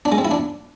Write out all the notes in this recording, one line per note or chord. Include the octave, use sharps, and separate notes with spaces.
D4
G#3
C4
E4
D4